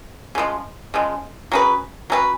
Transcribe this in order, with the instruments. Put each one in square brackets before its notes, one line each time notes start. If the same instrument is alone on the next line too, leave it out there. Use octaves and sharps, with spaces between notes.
[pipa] C#3 F3 G#3
C#3 F3 G#3
F#3 C#4 G#4 B4
F#3 C#4 G#4 B4